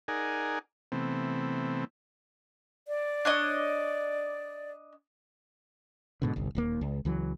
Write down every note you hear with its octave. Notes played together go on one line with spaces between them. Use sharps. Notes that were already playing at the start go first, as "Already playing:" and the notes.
D#4 G#4 A#4 D5 F#5 G#5
C3 E3 A3 B3 C4
D5
D4 C#5 D#5
G#2 B2 D3
G1 C2
D#1 D#2 A#3
C#2
C#2 E3 F#3